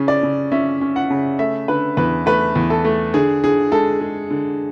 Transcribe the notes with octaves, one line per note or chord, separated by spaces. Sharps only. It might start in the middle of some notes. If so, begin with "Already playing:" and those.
Already playing: C#3 C#4
D5
C#3
C#4 E5
C#4
F#5
C#3
A3 E5
D3 B4
E2 B4
A3 B4
E2
A4
A3
D3 G#4
D3 G#4
G#3 A4
G#3
D3